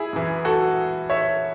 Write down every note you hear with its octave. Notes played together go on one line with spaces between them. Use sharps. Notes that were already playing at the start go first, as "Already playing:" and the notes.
Already playing: E4 G#4
F#2 E3
F#4 A4
C#5 E5